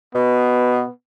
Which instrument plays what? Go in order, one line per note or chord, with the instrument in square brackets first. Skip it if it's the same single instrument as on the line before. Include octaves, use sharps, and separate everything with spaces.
[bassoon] B2 [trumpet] B3